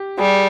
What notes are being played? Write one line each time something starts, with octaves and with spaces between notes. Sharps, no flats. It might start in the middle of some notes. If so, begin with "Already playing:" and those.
Already playing: G4
G3 G#4